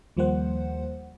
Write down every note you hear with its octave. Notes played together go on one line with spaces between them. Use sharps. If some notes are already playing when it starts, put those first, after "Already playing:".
D#2 F3 G3 A#3 C5 F#5